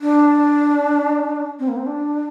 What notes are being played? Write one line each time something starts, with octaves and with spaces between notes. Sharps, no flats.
D4
C4
A#3
C4
D4
D4